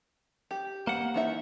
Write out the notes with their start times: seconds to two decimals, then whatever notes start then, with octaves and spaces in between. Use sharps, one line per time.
0.51 G4
0.87 A#3 F#5
1.14 E3 D#4 E5